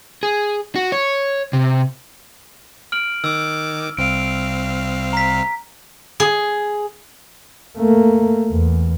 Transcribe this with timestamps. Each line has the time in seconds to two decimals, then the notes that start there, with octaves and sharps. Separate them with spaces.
0.23 G#4
0.76 F#4
0.92 C#5
1.53 C3
2.92 F6 D7 F#7
3.24 D#3 D6 E6
3.97 C2 C4 F5 D7
5.13 A#5 B6
6.20 G#4
7.77 A3 A#3
8.52 E2